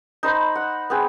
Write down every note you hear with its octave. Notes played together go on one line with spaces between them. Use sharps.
D#4 C5 B5
F#5
B3 C4 G#4